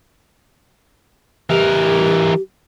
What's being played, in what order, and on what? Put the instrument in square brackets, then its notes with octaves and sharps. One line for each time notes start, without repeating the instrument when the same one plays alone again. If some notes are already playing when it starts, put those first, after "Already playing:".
[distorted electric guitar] E3 A#4 [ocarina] G4